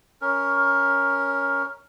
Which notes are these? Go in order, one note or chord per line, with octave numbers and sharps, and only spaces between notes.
C#4 A#4